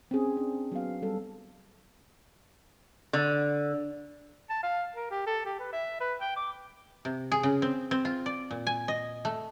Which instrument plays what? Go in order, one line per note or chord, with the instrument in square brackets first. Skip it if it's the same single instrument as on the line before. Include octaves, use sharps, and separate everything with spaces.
[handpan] C4 C#4 G#4
D4
F#3 B3 F5
G3 A4
[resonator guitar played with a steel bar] D3
[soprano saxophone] A5
F5
A#4
G4
A4
G4
B4
E5
B4
G5
D6
[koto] C3
G#4
C#3
C4
C4
F4
D5
A#2
G#5
D#5
A3